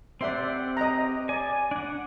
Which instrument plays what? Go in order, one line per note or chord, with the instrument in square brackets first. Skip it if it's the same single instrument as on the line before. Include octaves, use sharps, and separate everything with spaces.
[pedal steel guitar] C4 G4 F#5 [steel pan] D5 E5 C6
[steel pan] D#5 A#5
[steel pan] D5 [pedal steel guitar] G#5
[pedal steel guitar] D4 F#5